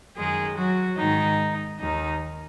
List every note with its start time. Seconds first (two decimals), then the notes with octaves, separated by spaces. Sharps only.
0.16 F#2 D#3 G#3 G#4
0.57 F#3 F#4
0.98 G#2 D#3 D#4
1.79 D#2 D#3 D#4